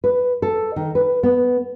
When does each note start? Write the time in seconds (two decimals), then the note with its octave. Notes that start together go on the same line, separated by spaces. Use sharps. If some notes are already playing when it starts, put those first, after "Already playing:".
0.04 B4
0.42 A4
0.76 D#3
0.95 B4
1.23 B3